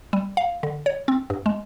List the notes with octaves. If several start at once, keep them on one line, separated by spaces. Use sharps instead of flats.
G3
F5
D3
C#5
C4
G2
G#3